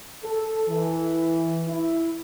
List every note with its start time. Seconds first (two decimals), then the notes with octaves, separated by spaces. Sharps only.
0.24 A4
0.69 E3
1.69 E4